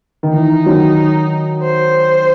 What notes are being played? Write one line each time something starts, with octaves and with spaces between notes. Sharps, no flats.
D#3
E3 D#4
D#3 F#3
C5